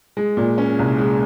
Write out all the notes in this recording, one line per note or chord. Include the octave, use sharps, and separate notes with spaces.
G#3
A#2
C#4
C2
G#3